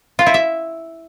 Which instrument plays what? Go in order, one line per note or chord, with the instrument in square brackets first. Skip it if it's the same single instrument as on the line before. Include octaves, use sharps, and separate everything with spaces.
[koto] F4
E4
E5